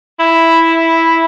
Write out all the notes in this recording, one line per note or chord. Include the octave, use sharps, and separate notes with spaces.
E4